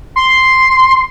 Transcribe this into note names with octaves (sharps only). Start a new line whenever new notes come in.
C6